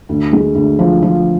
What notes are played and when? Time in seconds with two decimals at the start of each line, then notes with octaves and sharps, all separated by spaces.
0.09 D2
0.33 G#3
0.55 D2
0.79 F3
1.02 F3